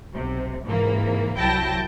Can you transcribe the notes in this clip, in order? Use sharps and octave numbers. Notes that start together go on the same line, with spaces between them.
B1 C3
G#2 C3 E3 A#3
C2 F#3 E4 G5 A5 A#6